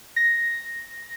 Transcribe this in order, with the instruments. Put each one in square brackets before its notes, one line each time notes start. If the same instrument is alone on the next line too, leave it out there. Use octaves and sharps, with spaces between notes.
[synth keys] A#6